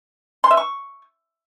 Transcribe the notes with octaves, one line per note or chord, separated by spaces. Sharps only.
C6
E5
C#6